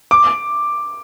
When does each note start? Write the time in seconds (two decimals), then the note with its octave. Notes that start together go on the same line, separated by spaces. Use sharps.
0.11 D6